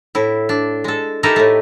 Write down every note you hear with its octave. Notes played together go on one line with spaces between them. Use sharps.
A2 E4
D4
G#3 A4
D#4 E4 G4 A4 A#4
A2 A3